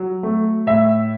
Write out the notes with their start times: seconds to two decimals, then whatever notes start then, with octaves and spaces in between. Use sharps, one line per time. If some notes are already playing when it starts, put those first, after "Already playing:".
Already playing: F#3
0.23 A3
0.67 A2 E5